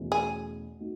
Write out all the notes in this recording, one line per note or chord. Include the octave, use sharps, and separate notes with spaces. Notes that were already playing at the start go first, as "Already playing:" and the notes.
Already playing: E2 B2 A3 C#4
G#4
A3 D#4 F#4